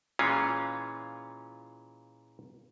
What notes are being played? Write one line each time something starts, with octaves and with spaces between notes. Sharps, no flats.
A#2 E3 G#3 C#4 F4